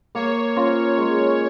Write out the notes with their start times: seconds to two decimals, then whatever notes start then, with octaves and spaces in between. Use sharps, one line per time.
0.15 A#3 C#5
0.56 C#4 F4 A#4
0.97 G#3